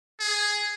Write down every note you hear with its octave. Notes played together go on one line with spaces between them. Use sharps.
G#4